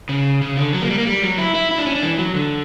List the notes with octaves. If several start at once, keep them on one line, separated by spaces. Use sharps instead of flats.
C#3
C#3
D3
F#3
A#3
G3
A#3
G3
F#3
E4
E4
E4
D4
C#4
D4
E3
F#3
D3